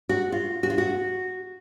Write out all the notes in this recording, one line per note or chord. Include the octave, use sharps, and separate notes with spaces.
F#4
F4
F#4
F4
F#4